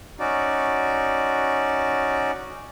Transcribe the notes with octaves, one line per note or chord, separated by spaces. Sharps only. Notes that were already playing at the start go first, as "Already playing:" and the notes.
C#4 D#4 F#4 D5